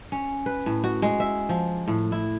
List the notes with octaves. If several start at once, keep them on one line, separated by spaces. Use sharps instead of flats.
C#4
B4
A2
F#4
G#3
E5
F3
A2
E4